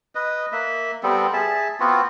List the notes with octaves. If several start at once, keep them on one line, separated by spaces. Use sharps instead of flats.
B4 D#5
A#3 E5
G3 B3 C4 A4
G#4 E5 A5
B3 C4 F4 F#4